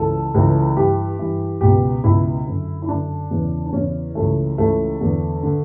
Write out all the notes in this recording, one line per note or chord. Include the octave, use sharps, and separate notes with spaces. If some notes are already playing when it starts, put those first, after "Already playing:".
Already playing: C#2 C#3 E3 A4
C#2 C#3 E3
G2 E3 G4
G2 E3
C#2 B2 G4
C#2 B2 E4
F#2 D3
E4
F#2 D3 D4
E2 C#3 E3
D4
E2 C#3 E3 C#4
C#2 C#3 E3 A3
C#2 C#3 E3 A3
E2 D3
D3